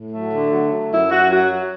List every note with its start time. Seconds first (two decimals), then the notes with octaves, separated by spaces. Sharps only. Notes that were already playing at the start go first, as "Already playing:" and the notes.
Already playing: A2
0.12 F#3 A3
0.32 D3
0.52 F#3
0.71 F#3
0.90 F#2 E4
1.11 F#2 F#4
1.30 F#3 F#4